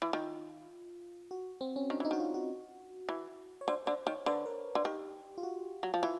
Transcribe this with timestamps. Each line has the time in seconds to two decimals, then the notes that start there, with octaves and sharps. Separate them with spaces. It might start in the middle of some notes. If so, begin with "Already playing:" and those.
0.02 E3
0.13 D#3 F4
1.31 F#4
1.61 C4
1.76 C#4
1.90 D#3 D4
2.00 E3 D#4
2.11 D#3 F#4
2.20 F4
2.34 F#4
3.09 E3
3.61 C#5
3.68 D3 C5
3.86 D3 C5
4.06 D#3 C#5
4.26 D3 B4
4.46 A#4
4.75 D3
4.84 D#3 G4
5.38 F4
5.43 F#4
5.83 F#3
5.94 F3
6.03 E3 F4